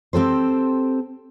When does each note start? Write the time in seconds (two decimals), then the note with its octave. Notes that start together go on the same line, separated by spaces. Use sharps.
0.13 C4 G4 A4 C5